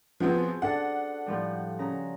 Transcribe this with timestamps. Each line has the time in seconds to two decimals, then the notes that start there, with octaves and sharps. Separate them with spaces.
0.20 F3 B3 C4 F#4 G#4 C5
0.62 D4 A4 F#5
1.26 A2 F3 G3
1.79 C#3 A#5